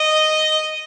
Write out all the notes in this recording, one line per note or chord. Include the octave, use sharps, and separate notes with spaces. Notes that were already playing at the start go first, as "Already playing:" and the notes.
Already playing: D#5